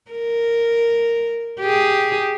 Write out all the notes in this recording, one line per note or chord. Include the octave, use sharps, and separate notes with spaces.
A#4
G4 G#4